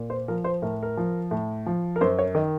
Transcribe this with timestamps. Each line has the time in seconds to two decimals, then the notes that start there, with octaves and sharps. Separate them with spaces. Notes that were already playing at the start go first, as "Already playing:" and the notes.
Already playing: A#2
0.10 C5
0.28 F3 A#4
0.44 C5
0.62 A2 A#4
0.83 A#4
0.97 F3
1.31 A2
1.66 F3
1.96 A#4
2.01 F#2 C5
2.19 C#5
2.35 D#3 D#5